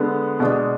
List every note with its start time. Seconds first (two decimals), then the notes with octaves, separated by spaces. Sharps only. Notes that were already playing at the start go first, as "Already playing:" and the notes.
Already playing: D3 G#3 B3
0.40 B2 G#3 D4